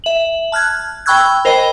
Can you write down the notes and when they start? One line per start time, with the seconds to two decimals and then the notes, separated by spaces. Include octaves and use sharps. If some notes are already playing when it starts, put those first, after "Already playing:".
0.04 E5 F#7
0.52 A5 F6 F#6 G#6
1.06 G5 B5 C#6 E6 F#6 G#6
1.45 A#4 C5 D#5 G5 B5